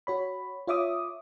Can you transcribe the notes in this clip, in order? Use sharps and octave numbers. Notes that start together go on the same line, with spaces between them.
F#4 C#5 B5
F4 C#5 E5 D6 D#6